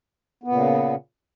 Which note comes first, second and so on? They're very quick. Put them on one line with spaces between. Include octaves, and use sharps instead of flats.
B3 A#2 C#3